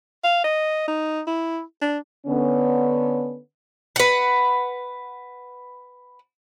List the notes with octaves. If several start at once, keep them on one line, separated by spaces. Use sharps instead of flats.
F5
D#5
D#4
E4
D4
D3 B3 C#4
B4 F#5